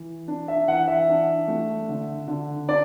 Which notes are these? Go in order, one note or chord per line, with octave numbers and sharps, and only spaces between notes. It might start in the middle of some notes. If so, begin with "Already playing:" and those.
Already playing: E3
D4
E5
E3 F#5
E5
D4
A3
D3
D3
D4 D5